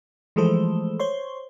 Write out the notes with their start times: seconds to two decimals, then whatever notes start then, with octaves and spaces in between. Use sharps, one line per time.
0.36 E3 F3 G#3 A3 A4 C5
1.00 C5 C#5 C6